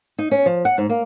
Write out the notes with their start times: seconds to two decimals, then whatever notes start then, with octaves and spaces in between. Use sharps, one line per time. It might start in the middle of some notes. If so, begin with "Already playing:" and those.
0.19 D#4
0.31 C#4
0.46 F3
0.65 F#5
0.78 G#2
0.89 A#3